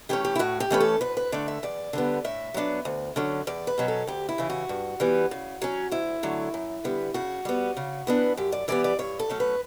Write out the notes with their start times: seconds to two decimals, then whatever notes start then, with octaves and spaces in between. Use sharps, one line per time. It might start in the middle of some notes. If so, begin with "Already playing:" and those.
0.09 E3 A3 C#4 G4
0.25 G4
0.36 E4
0.39 A2 F#4
0.60 G4
0.71 E3 A3 C#4 B4
0.80 A4
1.01 D2 B4
1.17 B4
1.32 D3 A3 D5
1.48 E5
1.63 E2 D5
1.93 D3 G3 B3
2.24 A2 E5
2.54 F#3 B3 D4
2.85 D2
3.16 D3 F#3 C#4
3.47 E2 D5
3.67 B4
3.78 B2 F#3 C#4
3.88 A4
4.07 D2 G4
4.29 E4
4.38 C#3 E3
4.50 F#4
4.69 G2
5.00 E3 G3 B3
5.31 C#3
5.62 F#3 C#4
5.91 D2 E4
6.23 D3 F#3 A3
6.54 F#2
6.84 D3 G3 B3
7.14 C#3 F#4
7.45 G3 B3
7.77 C#3
8.07 E3 B3 D4
8.37 F#2 G4
8.52 D5
8.68 E3 G3 B3 D5
8.84 D5
8.99 G2 C#5
9.19 A4
9.30 F#3 A3 C#4
9.40 B4